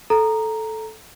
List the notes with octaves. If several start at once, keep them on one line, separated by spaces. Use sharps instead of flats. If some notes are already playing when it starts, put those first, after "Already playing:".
A4 A#5